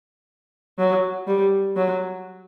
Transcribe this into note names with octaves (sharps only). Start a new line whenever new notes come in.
F#3
G3
F#3